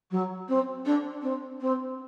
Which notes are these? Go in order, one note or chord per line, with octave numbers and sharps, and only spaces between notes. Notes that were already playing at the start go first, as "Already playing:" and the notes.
F#3
C4
D4
C4
C4